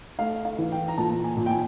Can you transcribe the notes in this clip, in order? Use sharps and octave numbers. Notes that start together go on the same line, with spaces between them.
A3 F5
F5
E3
G5
A#5
A#2 A5
G#5
A#2
G5
G#5